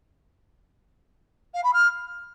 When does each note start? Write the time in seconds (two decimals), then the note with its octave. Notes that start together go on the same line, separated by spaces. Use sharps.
1.54 F5
1.64 B5
1.73 F6